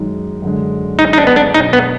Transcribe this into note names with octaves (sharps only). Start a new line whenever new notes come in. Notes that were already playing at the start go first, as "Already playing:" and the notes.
Already playing: F#2 D#3 G#3 D#4
F#2 D3 G#3
D#4
D#4
D4
B3
D4
B2 F#3 D4 D#4
B3